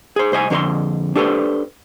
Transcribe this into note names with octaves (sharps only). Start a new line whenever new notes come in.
G#4 C5
C2 C5 D#5 G#5
F2 D3 A4 D#5 C6
D4 G4 A4 B4 C5